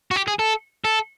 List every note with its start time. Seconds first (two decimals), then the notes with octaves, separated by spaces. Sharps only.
0.11 F#4
0.16 G4
0.28 G#4
0.39 A4
0.84 A4